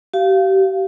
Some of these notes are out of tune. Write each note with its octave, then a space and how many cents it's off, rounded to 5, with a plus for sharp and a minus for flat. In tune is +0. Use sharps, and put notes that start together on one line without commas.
G4 -35 F5 -10